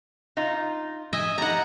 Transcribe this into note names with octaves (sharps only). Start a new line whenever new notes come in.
D#4 F4
D#5 E5 G#5
G3 D#4 F#5 A#5